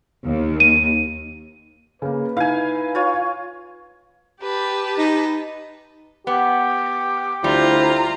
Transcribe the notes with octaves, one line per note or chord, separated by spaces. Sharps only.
D#2
D#7
C#3 A#3 B4
D#4 E4 F5 G#5
F4 C#5
G4 B4 A5
D#4
B3 G4
D2 G3 E4 F4 C5 A#5